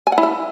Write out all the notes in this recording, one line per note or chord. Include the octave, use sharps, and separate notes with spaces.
G#5
F#5
E4
E5